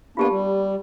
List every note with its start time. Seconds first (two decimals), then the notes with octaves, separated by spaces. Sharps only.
0.17 A#3 B3 D4 F4 G4 A5
0.31 G3